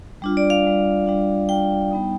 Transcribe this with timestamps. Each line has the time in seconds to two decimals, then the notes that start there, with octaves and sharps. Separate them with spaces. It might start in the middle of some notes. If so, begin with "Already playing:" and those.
0.22 G3 D4 F4
0.37 D5
0.50 F5
0.64 G3 D4 F4
1.06 G3 D4 F4
1.49 G3 D4 F4 G5
1.91 G3 B3 D#4